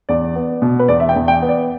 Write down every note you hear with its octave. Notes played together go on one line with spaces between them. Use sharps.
E2 D5
B3
B2
B4
E2 D5
E5
G5
E2
G5
B3
D5